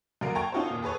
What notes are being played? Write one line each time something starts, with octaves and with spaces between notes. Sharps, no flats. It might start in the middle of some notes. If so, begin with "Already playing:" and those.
F#2 D3 A#3 A#4 D7
G5 A5 A#5 C#6 G#6
C#4 D#4 F4 F#4 A4 C5
D#2 A#2
G#4 A4 B4 C#5